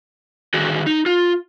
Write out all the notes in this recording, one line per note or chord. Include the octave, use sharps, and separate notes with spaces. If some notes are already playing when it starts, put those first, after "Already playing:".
D3 D#3 F#4 G#4
D#4
F4